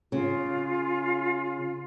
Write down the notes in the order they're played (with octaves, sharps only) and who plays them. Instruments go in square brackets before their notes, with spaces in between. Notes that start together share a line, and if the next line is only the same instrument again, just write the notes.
[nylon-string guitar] C#3 [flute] F4